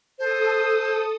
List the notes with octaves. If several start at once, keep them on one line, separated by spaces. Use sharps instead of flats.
A4 C5 D#6